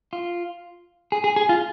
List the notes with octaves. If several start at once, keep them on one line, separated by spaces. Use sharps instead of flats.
F4
G#4
G#4
G#4
F4